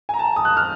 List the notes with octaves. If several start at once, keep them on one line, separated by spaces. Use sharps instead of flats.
G#5
A#5
A5
D#6
F#6
F6